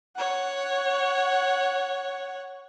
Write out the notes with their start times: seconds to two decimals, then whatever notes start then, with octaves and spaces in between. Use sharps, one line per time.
0.16 C#5 F#5